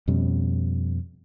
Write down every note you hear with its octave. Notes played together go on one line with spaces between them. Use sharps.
F2 B2 G3 C#4